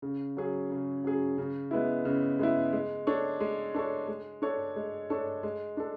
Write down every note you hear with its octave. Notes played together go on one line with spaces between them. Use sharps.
C#3
F#3 C#4 G#4
C#3
F#3 C#4 G#4
C#3
G#3 B3 E4
C#3
G#3 B3 E4
G#3
D4 A4 C#5
G#3
D4 A4 C#5
G#3
D4 A4 C#5
G#3
D4 A4 C#5
G#3
D4 A4